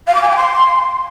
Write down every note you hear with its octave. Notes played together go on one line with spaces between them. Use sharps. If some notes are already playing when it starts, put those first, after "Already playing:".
F5
D6
G#5
G5
C6